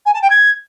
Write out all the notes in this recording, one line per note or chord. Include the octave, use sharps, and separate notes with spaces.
G#5
A5
G5
G#6